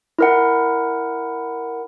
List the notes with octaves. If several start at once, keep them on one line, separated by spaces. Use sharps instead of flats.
E4 A#4 F#5